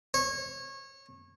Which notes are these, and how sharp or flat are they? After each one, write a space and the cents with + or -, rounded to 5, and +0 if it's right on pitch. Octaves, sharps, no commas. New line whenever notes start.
C#5 -25